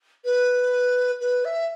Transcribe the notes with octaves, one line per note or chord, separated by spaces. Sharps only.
B4
B4
E5